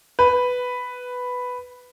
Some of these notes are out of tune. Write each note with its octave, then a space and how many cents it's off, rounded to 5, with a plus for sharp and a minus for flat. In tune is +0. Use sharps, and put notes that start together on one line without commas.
B4 +5